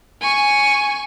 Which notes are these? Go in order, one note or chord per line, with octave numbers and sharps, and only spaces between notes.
G#5 C#6